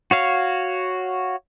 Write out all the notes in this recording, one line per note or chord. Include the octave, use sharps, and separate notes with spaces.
F#4 C#5 F5